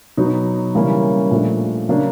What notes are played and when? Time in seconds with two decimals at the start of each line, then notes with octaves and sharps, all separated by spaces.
0.17 B2 F#3 B3 D#4
0.75 C#3 E3 G3 A#3 C#4
1.31 A#2 F3 A3 D4
1.89 C#3 F#3 A#3 D4